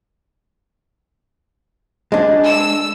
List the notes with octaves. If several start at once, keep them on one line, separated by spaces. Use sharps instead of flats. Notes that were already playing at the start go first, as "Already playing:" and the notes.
G#3 D4
E6